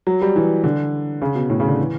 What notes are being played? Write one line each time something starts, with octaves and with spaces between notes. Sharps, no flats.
F#3
G3
E3
D3
C#3
B2
A2
C#3
D3
E3